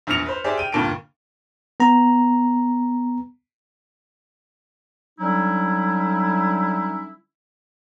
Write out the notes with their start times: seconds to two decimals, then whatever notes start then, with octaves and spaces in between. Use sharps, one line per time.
0.07 A#1 E2 F6 A#6 C#7 F7
0.26 B4 C5
0.44 G4 G#4 C5 D5 E5
0.57 G5 D#7
0.72 D2 G2 A#2 G5 A5 D7
1.80 B3 A#5
5.19 D3 F#3 G3 C#4 D#4 E4